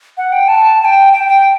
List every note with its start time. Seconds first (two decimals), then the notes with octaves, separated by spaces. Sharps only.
0.18 F#5
0.32 G5
0.48 A5
0.80 A5
0.85 G5
1.13 G5
1.28 G5